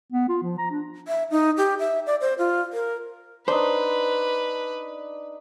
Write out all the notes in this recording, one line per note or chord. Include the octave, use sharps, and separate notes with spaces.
B3
F4
F3
A#5
D4
E5
D#4
G4
E5
D5
C5
F4
A#4
D4 D#4 B4 C5